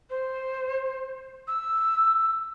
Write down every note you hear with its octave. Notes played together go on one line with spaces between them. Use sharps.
C5
E6